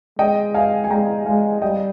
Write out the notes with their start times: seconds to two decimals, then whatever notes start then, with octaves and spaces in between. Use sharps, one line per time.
0.19 G#3 D#5 G5
0.54 F5 G#5
0.84 G#5
0.90 G#3 G5 A#5
1.26 G#3 F5 G#5
1.62 G3 D#5 G5